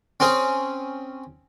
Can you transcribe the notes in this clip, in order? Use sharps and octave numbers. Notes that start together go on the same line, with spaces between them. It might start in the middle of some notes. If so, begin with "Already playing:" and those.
C4 C#4 G#4